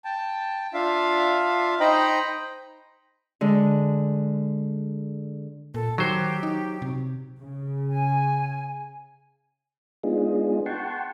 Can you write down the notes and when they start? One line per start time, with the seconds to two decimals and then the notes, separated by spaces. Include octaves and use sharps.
0.05 G5 A5
0.74 D4 F4 E5 F5
1.80 D#4 C5 D#5 G5 A#5 B5
3.41 D3 G#3
5.74 A#2 A4
5.98 D#3 F#3 G4 C5
6.43 D#4
6.82 C3
7.39 C#3
7.88 G#5
10.03 G#3 B3 D4 D#4 F4 G#4
10.66 F#5 G5 A5 C6 C#6